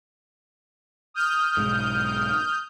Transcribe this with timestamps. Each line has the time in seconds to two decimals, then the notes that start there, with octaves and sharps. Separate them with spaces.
1.14 D#6 F6 G6
1.57 B1 G#2